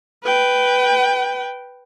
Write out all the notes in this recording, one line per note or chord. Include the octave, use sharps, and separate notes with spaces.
B4 G5